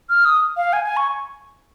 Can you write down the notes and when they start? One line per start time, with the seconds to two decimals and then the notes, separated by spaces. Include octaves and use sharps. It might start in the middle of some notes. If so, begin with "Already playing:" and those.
0.10 F6
0.25 D#6
0.57 F5
0.73 G#5
0.84 G#5
0.97 C#6